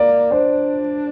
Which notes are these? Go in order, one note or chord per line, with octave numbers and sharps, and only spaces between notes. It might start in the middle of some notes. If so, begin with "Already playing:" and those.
Already playing: A#3 D5
D4 C5